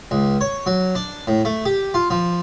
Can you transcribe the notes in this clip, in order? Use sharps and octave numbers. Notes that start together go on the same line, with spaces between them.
C#2
C#5
F#3
D4
A2
A3
G4
F4
F3